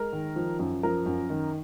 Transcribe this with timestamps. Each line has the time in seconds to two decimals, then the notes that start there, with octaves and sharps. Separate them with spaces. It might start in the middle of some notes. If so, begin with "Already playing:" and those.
Already playing: G#3 A#4
0.13 D#3
0.36 F3
0.59 F#2
0.83 F3 A#4
1.06 F#2
1.30 D#3